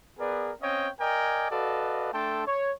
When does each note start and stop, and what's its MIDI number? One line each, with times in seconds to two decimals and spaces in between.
0.19 0.53 59
0.19 0.53 68
0.19 0.53 70
0.19 0.53 71
0.19 0.53 74
0.62 0.89 60
0.62 0.89 61
0.62 0.89 73
0.62 0.89 75
0.62 0.89 77
0.62 0.89 79
1.01 1.49 70
1.01 1.49 74
1.01 1.49 75
1.01 1.49 79
1.01 1.49 80
1.51 2.10 66
1.51 2.10 69
1.51 2.10 71
1.51 2.10 74
1.51 2.10 75
1.51 2.10 77
2.13 2.46 57
2.13 2.46 62
2.13 2.46 69
2.13 2.46 79
2.13 2.46 81
2.13 2.46 84
2.47 2.72 73